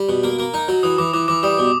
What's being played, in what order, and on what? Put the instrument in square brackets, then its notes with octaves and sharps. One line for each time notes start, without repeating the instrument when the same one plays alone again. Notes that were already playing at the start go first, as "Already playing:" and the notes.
Already playing: [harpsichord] G3
B2
A#3
A#3
D#4
F#3
[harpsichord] E3 [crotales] D#6
[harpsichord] E3 [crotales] D6
[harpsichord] E3 [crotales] D6
[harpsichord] E3 [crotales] D6
[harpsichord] G3 [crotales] D#6
[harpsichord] B2